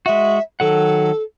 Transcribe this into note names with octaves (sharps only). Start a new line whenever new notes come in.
G#3 F#4 E5
D#3 F#3 A4 F#5